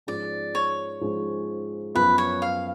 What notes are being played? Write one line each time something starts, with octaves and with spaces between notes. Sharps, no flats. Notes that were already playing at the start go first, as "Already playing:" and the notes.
G#2 F3 G#3 C#4 D5
C#5
G#2 F3 G#3 C#4
F#2 F3 B3 F4 B4
C#5
F5